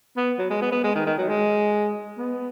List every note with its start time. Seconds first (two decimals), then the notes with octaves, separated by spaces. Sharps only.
0.17 B3
0.39 F#3
0.50 G#3
0.61 B3
0.72 B3
0.84 G#3
0.95 D#3
1.06 D#3
1.18 F#3
1.28 G#3
2.18 B3